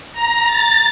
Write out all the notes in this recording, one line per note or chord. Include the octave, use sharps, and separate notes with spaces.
A#5
A6